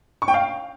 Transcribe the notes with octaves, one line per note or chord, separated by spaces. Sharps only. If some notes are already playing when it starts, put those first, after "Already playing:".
C#6
G5
F5